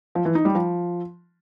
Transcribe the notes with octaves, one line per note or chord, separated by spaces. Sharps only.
F3
E3
D#4
G3
F3